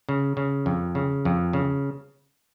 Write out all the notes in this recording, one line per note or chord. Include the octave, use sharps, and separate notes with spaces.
C#3
C#3
F2
C#3
F2
C#3